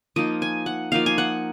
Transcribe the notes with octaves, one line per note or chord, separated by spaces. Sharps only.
F3 A#3 D#4 D#5
G#5
F#5
F3 A#3 D#4 F5
G#5
F#5